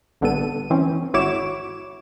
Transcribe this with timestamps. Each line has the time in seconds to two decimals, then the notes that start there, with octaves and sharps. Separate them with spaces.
0.21 A1 D3 G3 B3 A4 D#7
0.70 E3 C4 C#4
1.14 G#1 E4 F#4 C#5 D6 E7